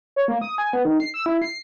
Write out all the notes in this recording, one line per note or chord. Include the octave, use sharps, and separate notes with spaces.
C#5
A#3
D#6
G#5
B3
D#3
C7
E6
E4
C7